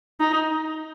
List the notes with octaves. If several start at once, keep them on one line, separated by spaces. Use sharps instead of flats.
D#4